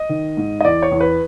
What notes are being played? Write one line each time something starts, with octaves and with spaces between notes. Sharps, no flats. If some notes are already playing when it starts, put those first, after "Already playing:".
Already playing: D#5
D#3
G#2
D#5
E2 D5
C#5
E2
B4